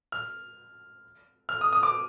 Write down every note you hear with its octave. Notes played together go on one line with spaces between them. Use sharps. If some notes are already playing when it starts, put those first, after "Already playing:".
F6
F6
D#6
D#6
D6